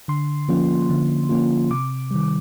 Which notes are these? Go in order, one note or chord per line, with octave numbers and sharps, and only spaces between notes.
D3 C6
F3 A#3 C#4 F4
D3
F3 A#3 C#4 F4
C3 D6
D#3 G3